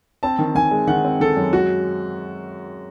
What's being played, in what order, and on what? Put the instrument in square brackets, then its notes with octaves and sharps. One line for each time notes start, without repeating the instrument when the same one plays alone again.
[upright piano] C4 [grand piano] A5
[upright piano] D#3
[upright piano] D#3 [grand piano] G#5
[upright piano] G#3
[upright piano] D#3 [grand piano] F#5
[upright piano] C4
[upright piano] D#3 [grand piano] A4
[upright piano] F#2
[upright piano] G#3 [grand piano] F#4